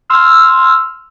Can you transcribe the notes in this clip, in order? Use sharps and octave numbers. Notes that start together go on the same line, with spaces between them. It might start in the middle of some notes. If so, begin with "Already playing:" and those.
C6 E6 F6